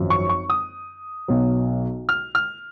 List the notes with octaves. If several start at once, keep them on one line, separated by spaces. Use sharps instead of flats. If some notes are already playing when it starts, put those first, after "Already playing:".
Already playing: G#1 F#2 F3
C#6
C#6
D#6
B1 B2 F#3
F6
F6